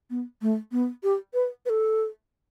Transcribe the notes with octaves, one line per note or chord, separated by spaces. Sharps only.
B3
A3
B3
G4
B4
B4
A4